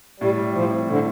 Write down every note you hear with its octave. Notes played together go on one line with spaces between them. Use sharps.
A2 G3
G3
A2 F3
C4
A2 D3